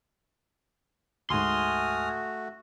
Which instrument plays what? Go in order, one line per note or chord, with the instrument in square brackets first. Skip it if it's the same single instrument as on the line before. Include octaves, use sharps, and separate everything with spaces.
[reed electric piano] D2 G#2 [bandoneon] A3 F#4 [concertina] G#5 D#6 F6 [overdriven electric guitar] C6